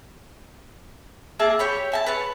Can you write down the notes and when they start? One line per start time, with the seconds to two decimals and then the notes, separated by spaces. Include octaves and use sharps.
1.39 A#3 G#4 E5 A5
1.59 G4 C#5 B5
1.92 E4 G#5 A5
2.06 B4 C#5 A5